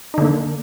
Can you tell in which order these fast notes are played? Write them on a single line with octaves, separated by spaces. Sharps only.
D#4 D3 A#3